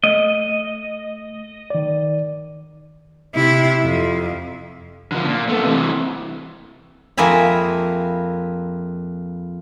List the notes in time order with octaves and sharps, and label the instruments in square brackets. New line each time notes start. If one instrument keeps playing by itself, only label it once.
[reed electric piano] A3 [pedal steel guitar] D#5
[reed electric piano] D#3 D5
[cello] C3 E4
F2
[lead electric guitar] D3 F3
A#2
A3 B3
C3 E3
[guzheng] F2 A#3 G#4 E5 G#5 B5